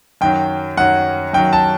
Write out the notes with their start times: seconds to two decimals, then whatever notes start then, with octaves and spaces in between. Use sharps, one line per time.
0.21 F#2 D#3 F#3 G5
0.77 F#2 D#3 F#3 F#5
1.33 F#2 D#3 F#3 G5
1.53 A5